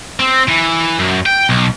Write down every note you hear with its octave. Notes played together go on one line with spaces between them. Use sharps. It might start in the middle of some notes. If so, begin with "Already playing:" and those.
C4
E3
F#2
G5
B1